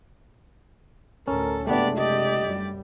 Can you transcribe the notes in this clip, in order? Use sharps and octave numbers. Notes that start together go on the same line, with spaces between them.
D2 A2 C#4 A4 A#4
F#1 C3 G#3 A3 B3 D4 G4 D5
G4 D5 D#5
F#2 G3